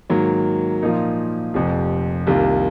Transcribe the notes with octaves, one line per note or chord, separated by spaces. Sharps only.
G#2 D#3 F#3 A#3
A#2 F3 A#3 D#4 A#4
F1 F2 C3 F3
C2 C3 D#3 A#3 F4